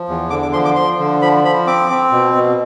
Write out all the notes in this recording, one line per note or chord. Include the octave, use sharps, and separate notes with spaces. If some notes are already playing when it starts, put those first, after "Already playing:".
Already playing: F3
E2
D3 D6
D6
F3 C6
D6
F3 C6
D3
F3 B5
F3 B5
C4 D6
C4
B2
B2